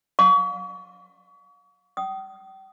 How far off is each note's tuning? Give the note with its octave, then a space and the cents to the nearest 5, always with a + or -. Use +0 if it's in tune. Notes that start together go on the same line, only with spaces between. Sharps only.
F5 +35 C#6 +35
G5 -40 D#6 +0